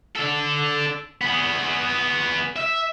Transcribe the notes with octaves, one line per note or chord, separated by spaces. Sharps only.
D4 A4
B3 G#4
E5